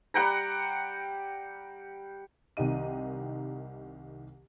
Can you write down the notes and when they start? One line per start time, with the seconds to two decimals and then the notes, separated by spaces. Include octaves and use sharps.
0.14 G3 F#5 G5 A#5
2.57 C2 D#3 G4 D#5 D#7